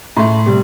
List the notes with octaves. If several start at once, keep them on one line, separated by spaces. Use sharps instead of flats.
A2 A3 C6
C3 G3